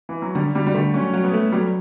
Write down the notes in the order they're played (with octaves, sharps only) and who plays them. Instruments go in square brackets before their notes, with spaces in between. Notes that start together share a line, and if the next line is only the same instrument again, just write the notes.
[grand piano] E3
F#3
[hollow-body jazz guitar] D3 [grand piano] G3
[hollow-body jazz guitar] D3 [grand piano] G3
[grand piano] G3
[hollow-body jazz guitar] D3 [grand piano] A3
[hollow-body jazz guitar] F#3 [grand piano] C#4
[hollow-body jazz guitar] F#3
[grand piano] B3
[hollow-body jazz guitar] A3
[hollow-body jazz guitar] F#3 [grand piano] G3